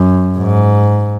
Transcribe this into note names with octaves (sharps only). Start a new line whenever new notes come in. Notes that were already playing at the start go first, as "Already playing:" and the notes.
Already playing: F#2
G#2